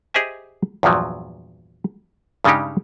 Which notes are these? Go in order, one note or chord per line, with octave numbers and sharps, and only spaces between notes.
G4 G#4 C5 D#5 E5 G#5
E2 G2 A#2 F3 F#3
G2 C#3 G3 G#3 D#4 G4